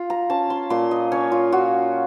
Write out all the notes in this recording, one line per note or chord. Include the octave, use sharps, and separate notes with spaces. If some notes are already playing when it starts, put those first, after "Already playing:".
Already playing: F4
A#5
C#4 A5
C6
A#2 C6
D#5
C#4 C#5
F4
F4 F#4